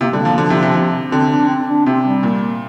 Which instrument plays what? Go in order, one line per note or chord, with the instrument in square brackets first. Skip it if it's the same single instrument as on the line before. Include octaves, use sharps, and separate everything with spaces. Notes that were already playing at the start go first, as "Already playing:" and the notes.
[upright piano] C3 [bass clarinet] A#3
[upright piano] D3 [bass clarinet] G3
[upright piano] F3 [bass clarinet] A#3
[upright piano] D3 [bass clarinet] F3
[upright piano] C3
C3
C3
[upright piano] D3 [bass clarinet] C4
[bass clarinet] D4
C4
D4
[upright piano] C3 [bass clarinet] C4
[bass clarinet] G3
[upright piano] A#2